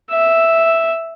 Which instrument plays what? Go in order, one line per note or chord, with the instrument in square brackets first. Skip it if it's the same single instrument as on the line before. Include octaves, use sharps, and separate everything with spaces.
[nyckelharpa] E5